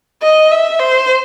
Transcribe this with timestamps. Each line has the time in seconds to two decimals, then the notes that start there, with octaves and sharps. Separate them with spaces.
0.23 D#5
0.51 E5
0.80 C5